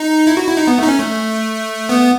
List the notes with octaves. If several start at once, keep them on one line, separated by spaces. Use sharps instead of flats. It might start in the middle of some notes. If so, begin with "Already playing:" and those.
Already playing: D#4
E4
F#4
E4
D#4
B3
A3 D#4
C#4
A3
B3